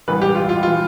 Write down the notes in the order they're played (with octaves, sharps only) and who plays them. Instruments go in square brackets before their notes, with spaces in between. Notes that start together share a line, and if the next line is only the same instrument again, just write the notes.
[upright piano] A1 G2 E3 B4
G4
F4
F4
E3 F4